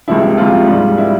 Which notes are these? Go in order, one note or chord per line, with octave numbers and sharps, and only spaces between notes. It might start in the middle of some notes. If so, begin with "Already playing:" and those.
C#2 C3 F3 E4
E4
C#2 C3 F3 F4
G#2 G3
G3 E4